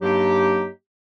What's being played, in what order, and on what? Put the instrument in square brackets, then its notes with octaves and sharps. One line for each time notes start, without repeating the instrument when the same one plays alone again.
[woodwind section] G2 F#3 A#3 D#4 G4